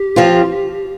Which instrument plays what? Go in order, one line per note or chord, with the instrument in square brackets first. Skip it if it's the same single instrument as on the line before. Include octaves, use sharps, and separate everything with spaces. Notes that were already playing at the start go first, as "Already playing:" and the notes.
Already playing: [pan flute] G4
[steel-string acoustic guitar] F3 C4 F4